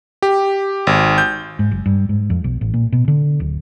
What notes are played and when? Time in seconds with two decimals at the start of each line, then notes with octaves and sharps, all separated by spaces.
0.22 G4
0.87 G#1
1.18 G6
1.59 G#2
1.71 F#1
1.86 G2
2.09 G#2
2.30 F2
2.44 B1
2.61 A1
2.74 A#2
2.93 B2
3.08 D3
3.40 D1